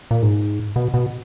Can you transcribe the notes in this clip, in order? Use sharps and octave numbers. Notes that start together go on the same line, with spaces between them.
A#2
G#2
B2
B2